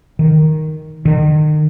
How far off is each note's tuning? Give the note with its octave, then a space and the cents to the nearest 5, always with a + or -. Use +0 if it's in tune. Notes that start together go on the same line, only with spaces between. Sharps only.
D#3 +0
D#3 -35